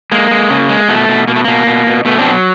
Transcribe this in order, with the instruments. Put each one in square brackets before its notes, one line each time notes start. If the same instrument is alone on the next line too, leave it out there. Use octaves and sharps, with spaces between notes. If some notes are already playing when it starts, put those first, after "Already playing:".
[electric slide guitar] G#3 A#3
G#3
C#3
G#3
B2 A3
B2
B2 A#3
A3
B2 A#3
B2
B2
B2 A3 B3
C4 D4
F#3